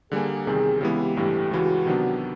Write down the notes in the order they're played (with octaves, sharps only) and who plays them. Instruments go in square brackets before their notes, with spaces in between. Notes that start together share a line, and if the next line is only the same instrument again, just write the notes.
[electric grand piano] D3 G3 A#3 [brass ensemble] G#4
[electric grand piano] E2 C3 D#3 G3 C4 [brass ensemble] G#4
[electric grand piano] C#3 E3 G#3 B3 E4 [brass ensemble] G4
[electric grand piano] A1 G2 E3 A3 [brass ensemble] G4
[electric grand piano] C#2 C#3 E3 [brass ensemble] F#4
[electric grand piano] C3 D#3 F#3 B3 D4